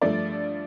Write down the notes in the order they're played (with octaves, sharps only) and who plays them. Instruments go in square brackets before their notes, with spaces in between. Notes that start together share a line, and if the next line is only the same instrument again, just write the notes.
[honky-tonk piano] G2 F3 A3 D5